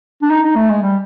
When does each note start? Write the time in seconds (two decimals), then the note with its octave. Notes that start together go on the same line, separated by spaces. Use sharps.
0.22 D4
0.30 D#4
0.43 D#4
0.56 A3
0.69 G#3
0.82 G3